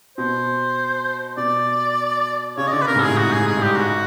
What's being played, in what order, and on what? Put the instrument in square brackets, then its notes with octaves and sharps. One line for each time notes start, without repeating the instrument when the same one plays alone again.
[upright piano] B2 [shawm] C5
[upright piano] B2 [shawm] D5
[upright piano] C#3 [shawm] C#5
[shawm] D#5
[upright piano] D3 [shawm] D5
[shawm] B4
[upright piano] C3 [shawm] A#4
[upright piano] G#2
[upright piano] A2 [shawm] G#4
[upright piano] G#2 [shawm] F#4
[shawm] G#4
[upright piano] G#2
[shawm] G#4
[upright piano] G2 [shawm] G4
[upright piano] G#2 [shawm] F#4